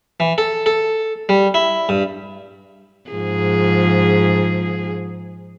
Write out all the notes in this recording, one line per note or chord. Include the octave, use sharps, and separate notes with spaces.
E3
A4
A4
G3
E4
G2
G#2 F3 G#4